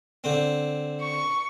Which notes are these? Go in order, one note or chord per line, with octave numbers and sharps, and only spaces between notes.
D3 C4
C#6